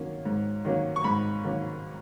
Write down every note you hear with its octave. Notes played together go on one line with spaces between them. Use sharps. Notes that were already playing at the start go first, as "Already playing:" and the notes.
Already playing: D#3 F#3 A#3 C#4
G#2
D#3 F#3 A#3 C#4
C#6
G#2 B5
D#3 F#3 A#3 C#4